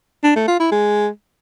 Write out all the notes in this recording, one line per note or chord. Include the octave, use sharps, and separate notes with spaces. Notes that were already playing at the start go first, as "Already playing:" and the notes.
D4
A3
F4
E4
G#3